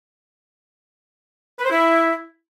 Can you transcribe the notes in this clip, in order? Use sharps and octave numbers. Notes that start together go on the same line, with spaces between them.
B4
C5
E4